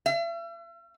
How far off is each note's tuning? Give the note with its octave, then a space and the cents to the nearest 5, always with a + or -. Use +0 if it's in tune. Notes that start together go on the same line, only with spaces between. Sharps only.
E5 +40